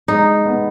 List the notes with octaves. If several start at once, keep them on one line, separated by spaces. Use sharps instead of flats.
G#3 D#4
B3